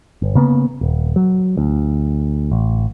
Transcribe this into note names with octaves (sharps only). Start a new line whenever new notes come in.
G1
C#3 A#3 B3
D#1
F#3
D2
A1